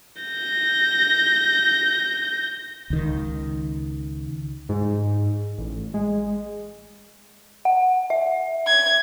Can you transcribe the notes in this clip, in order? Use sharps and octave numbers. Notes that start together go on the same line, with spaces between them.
G6 A#6
C#2 D#3
G#2
A1
G#3
F#5
E5
G#6